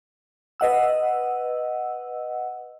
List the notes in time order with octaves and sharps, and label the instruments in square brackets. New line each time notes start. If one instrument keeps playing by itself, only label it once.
[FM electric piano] B4 D#5 F#5 E6